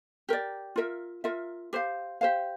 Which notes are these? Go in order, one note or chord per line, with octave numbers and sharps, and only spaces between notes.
G4 A#4 D5
F4 A#4 E5
F4 A#4 E5
G4 C5 F5
G4 C5 F5